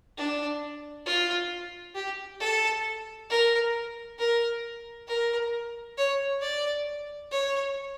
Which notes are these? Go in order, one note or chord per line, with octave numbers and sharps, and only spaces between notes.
D4
F4
G4
A4
A#4
A#4
A#4
C#5
D5
C#5